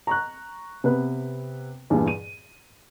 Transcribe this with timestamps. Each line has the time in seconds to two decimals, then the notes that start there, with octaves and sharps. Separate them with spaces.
0.07 A#5 C#6 F#6
0.84 C3 B3 B4
1.90 E2 G2 A#2 E3
2.08 D#7